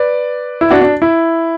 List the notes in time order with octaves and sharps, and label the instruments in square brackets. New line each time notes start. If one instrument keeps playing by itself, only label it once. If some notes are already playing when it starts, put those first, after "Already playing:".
Already playing: [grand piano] B4 D5
E4
D4 F#4
D4
E4